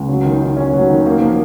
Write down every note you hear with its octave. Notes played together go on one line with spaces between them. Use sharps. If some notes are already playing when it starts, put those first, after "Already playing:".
Already playing: C#2
F#3
D#3
D#3
C#4
F#3
D#3
A#3
F3